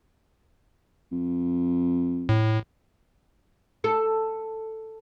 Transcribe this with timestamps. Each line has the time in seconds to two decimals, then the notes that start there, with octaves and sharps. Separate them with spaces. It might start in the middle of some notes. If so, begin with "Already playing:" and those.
1.12 F2
2.29 A2
3.84 A4